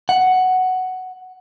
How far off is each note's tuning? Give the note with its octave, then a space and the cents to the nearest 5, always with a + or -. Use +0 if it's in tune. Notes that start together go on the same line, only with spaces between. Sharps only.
F#5 +5